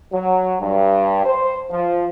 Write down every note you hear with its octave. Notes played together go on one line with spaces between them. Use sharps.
F#3
G2
C5
F3